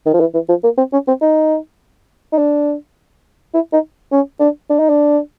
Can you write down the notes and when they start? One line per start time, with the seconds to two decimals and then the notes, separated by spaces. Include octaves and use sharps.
0.06 D#3
0.14 F3
0.20 E3
0.34 E3
0.49 F3
0.64 A#3
0.77 C4
0.93 C#4
1.08 C4
1.21 D#4
2.32 D#4
2.38 D4
3.54 E4
3.73 D#4
4.12 C#4
4.40 D4
4.70 D4
4.79 D#4
4.89 D4